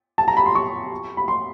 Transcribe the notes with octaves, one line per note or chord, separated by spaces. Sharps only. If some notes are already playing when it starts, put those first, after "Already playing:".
A5
A#5
B5
C6
C#6
B5
C6